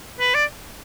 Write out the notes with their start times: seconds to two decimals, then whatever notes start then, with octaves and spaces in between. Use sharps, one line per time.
0.20 B4
0.35 D5